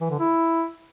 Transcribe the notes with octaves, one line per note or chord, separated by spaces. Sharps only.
E3
D3
E4